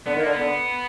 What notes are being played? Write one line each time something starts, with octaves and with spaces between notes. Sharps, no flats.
D3 B3
D#3 A#3
D3
B3
D3